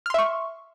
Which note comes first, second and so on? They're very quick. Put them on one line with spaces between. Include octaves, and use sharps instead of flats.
F6 C6 E5 C#6